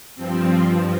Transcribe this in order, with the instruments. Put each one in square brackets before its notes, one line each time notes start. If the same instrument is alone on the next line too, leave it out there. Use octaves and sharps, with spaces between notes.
[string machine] G2 F3 C4